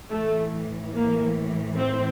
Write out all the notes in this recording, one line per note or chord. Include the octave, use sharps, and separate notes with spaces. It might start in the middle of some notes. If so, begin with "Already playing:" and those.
A2 E3 A3
A#3
C4